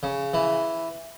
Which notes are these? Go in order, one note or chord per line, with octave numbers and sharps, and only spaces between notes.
C#3
E3